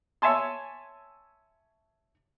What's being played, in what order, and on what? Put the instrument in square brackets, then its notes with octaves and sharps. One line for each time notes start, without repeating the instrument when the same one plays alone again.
[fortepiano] C#5 E5 G#5 A5 C6